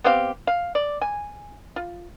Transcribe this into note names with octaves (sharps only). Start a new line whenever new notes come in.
B3 C4 G4 F5
F5
D5
G#5
F4